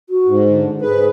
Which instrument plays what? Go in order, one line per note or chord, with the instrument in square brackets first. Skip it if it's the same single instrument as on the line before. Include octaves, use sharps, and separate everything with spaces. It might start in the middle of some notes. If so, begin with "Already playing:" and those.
[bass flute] F#4
[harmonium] G#2
[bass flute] D3
[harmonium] G#2 B4 [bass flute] G#4